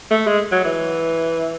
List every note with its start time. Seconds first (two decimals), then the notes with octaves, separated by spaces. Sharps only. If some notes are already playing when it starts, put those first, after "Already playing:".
0.10 A3
0.27 G#3
0.51 F#3
0.64 E3